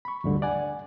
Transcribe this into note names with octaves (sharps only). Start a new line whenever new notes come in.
B5 C#6
D2 G2 D3
D5 F#5 G#5